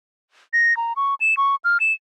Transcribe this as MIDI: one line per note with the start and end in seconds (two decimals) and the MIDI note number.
0.53 0.76 94
0.77 0.93 82
0.96 1.15 85
1.21 1.35 100
1.37 1.55 85
1.64 1.78 89
1.80 1.93 100